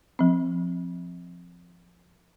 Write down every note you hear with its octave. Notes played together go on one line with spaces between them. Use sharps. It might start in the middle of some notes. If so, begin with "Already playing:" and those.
F3 C4